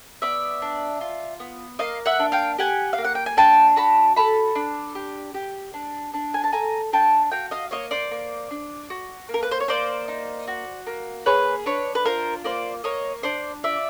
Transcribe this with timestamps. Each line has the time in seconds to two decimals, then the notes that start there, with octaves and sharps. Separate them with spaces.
0.22 B3 D5 E5
0.62 D4
1.01 F4
1.40 B3
1.79 A#3 D#5 F5
2.06 E5 F#5
2.19 D4
2.32 F5 G5
2.58 G4 F#5 G#5
2.93 F5
2.98 A#3
3.05 F#5
3.15 G5
3.26 G#5
3.37 D4 G5 A5
3.76 F#4 A5 B5
4.16 A4 A5 B5
4.56 D4
4.95 G4
5.34 G4
5.74 D4
6.14 D4
6.34 G#5
6.44 A5
6.53 A4 G#5 A#5
6.92 D4 G5 A5
7.31 F#4 F5 G5
7.51 D#5 F5
7.71 A#3 C#5 D#5
7.91 C5 D5
8.11 A#3
8.51 D4
8.90 F#4
9.29 A#3
9.34 A#4
9.43 B4
9.51 C5
9.60 C#5
9.68 A#3 C5 D5
10.08 D#4
10.48 F#4
10.87 A#3
11.26 G#4 B4 C#5
11.66 D4 B4 C#5
11.95 B4
12.05 F4 A#4 C5
12.44 A#3 C5 D5
12.84 A#3 C#5 D#5
13.23 D4 C5 D5
13.63 F4 D5 E5